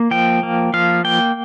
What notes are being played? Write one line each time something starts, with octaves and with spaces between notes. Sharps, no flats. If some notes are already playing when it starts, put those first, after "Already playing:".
Already playing: A#3
F3 G5
A#3
F3 F5
A#3 G5